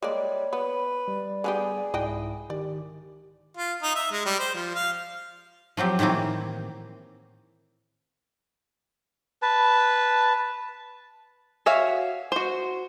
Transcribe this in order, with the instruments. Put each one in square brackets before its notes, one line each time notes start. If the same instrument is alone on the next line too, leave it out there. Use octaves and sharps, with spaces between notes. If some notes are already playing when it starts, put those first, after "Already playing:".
[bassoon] G3 [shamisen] G#3 A#3 D5 [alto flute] C#5
[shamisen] B3 [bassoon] B4
[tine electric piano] G3 [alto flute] D5
[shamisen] D3 B3 G4 [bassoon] G#4
[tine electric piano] C2 G#2 E4 [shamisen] B4 D#5 G5
[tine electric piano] D#3 [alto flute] G4 [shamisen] D5
[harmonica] F4
D#4
E5
G#3
G3
C5
F3
F5
[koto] F3 F#3 C4 G4
A2 D#3 E3 A#3 C4
[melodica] B4 A5
[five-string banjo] F#4 C#5 E5 F5 G#5
F#4 C5